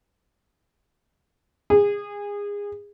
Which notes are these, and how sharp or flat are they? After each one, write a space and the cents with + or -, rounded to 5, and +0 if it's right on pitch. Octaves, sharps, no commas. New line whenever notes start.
G#4 -25